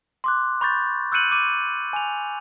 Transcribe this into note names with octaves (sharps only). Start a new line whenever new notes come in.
C6 D6 F#6
B5 C#6 G6 A6
E6 F#6 G6 C#7 D#7 F#7
D6 D#7
G#5 F7